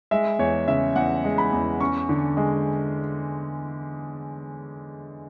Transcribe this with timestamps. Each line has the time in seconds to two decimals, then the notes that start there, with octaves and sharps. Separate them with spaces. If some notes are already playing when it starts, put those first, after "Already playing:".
0.11 G#3 E5
0.39 E2 C#5
0.68 C#3 E5
0.96 E2 F#5
1.24 G#3
1.38 B5
1.53 E2
1.80 C#4 C#6
2.09 D3
2.37 G#3